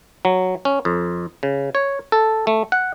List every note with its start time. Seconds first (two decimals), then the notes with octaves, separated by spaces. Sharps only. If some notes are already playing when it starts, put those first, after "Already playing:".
0.25 F#3
0.65 C#4
0.85 F2
1.43 C#3
1.75 C#5
2.12 A4
2.47 A3
2.72 F#5